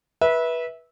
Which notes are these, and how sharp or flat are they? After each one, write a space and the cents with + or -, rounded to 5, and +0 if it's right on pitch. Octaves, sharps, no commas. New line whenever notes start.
B4 -20 E5 -15